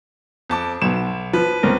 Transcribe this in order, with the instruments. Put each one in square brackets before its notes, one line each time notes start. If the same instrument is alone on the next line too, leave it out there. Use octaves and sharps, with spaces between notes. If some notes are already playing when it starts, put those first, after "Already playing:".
[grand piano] F2 A5 D6
[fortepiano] B1 [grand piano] E7
[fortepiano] F3 [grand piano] B4
[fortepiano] C#2 C4 A#4